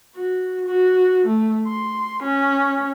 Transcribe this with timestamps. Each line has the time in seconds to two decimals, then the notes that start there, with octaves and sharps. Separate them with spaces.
0.16 F#4
0.66 F#4
1.26 A3
1.66 C6
2.23 C#4